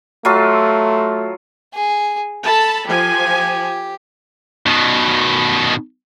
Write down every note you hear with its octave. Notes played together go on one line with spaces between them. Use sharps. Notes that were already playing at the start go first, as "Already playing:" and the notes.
F#3 A3 F4 A4
G#4
A4 A5 B5
F3 G4 G#5
B2 D#3